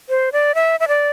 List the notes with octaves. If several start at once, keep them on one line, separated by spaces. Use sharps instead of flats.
C5
D5
E5
E5
D5